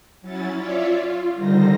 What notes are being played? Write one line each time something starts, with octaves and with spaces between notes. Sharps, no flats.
F#3 C#4 E4 A6
F4 C#5 D5 E5
F4
D3 D#3 G3 D#4 C5 A#6